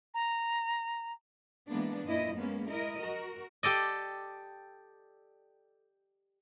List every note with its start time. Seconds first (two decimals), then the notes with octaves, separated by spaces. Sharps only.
0.14 A#5
1.69 E3 G#3 A#3 B3 D4
2.05 F#2 A#2 E4 D#5
2.36 G#3 A#3 B3 C#4
2.69 E4 A#4 D#5
3.00 F#4 A#4
3.63 G4 A4 D5 D#5